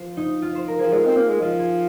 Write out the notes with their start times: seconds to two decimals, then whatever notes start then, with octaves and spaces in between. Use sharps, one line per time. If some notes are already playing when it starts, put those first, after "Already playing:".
Already playing: F3 C5
0.17 D#4
0.42 F4
0.55 C5
0.68 A#4
0.79 F3 G#4
0.92 G#3 F4
1.05 C4
1.16 A#3
1.29 G#3
1.41 F3 F4
1.59 G#4